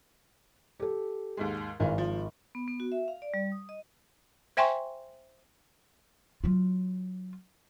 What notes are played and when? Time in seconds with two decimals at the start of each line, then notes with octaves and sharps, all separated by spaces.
0.80 G4 A4
1.37 D#2 G#2 G#3
1.80 G#1 D#3 E3 F4
1.98 F3
2.55 B3
2.68 B3
2.80 F#4
2.92 E5
3.08 F5
3.22 D5
3.34 G3
3.52 D#6
3.69 D#5
4.57 C5 E5 G5 G#5 C6 C#6
6.44 F#3 F4